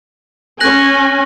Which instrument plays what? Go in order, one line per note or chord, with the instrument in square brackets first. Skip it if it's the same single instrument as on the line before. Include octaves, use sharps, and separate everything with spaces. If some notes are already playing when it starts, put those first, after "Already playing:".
[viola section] C#4 G#5 [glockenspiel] F#6 A#6 F#7